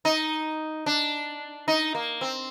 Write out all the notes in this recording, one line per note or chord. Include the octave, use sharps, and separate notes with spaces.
D#4
D4
D#4
A#3
C4